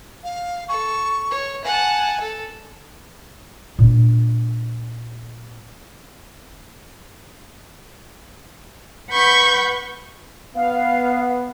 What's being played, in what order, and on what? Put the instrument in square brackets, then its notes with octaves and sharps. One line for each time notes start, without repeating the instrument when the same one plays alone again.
[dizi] F5
[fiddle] A4 [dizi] C#6
[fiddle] C#5
[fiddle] F#5 A5 [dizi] G#5
[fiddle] A4
[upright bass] A#2 D4
[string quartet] B4 F#5 B5 C#6 G6
[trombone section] B3 [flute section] F5